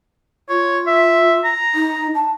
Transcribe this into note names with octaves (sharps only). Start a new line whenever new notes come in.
F4 C#5
E5
A#5
D#4
A5